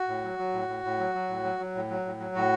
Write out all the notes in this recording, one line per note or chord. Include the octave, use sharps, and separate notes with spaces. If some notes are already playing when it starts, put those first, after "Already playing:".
Already playing: F#4
A2
F#3
F#3
A2
A2
A2
F#3
F#3
A2
F#3
F#3
A2
F#3
A2
F#3
A2 F#4